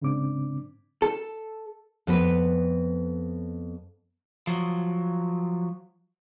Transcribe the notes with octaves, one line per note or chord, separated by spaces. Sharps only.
G#2 C#3 C4 D4 D6
A4
F2 B3 B4
F3 F#3